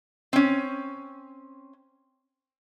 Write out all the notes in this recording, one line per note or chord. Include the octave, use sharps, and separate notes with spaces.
C4 C#4